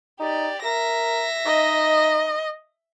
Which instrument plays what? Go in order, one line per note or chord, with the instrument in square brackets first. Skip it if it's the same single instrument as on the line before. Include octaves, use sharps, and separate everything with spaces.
[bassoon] D#4 [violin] G4 D5
[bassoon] A#4 [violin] E5 A#6
[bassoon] D#4 [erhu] D#5